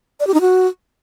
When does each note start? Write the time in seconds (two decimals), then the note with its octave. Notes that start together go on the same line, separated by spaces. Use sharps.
0.20 D5
0.27 G4
0.34 D#4
0.41 F#4